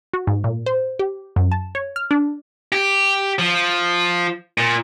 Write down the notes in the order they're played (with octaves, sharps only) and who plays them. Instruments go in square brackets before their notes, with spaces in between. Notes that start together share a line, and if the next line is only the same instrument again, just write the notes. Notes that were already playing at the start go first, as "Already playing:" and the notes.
[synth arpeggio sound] F#4
G#2
A#2
C5
G4
F#2
A5
C#5
F6
D4
[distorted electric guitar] G4
F3
A#2